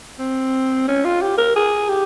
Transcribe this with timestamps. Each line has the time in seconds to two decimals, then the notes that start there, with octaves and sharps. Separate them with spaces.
0.19 C4
0.88 C#4
1.05 F4
1.22 G4
1.38 A#4
1.56 G#4
1.89 G4